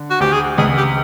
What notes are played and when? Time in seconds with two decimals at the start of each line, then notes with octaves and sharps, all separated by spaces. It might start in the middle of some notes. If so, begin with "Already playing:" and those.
Already playing: D3
0.10 F#4
0.20 D2 G4
0.33 G#4
0.58 C#2 G#4
0.77 G4